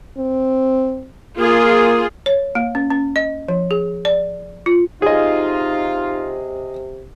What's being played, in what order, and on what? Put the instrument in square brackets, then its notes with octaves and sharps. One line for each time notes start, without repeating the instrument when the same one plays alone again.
[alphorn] C4
[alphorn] A#3 [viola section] F4 G#4
[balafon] C#5
A#3
C#4
C#4
D#5
F3
G#4
D5
F4
[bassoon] C3 [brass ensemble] D#4 F4 [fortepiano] G#4 D#5